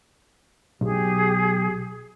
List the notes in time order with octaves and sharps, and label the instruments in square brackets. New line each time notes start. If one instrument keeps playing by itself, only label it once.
[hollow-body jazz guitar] B1 [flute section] G4 G#4